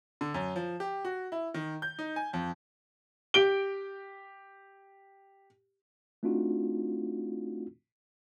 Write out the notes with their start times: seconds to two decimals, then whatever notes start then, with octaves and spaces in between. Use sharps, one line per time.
0.21 D3
0.34 F#2
0.56 F3
0.80 G4
1.05 F#4
1.32 E4
1.54 D#3
1.82 G6
1.99 D#4
2.16 G#5
2.33 F2
3.34 G4 D7 G7
6.23 A3 C4 D4 D#4 F4 F#4